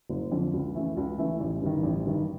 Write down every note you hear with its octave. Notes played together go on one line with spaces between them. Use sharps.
F#1
F2 D3
C#2
C#3 E3 A3
C#2
C#3 E3 A3
A1
G2 D#3
A1
G2 D#3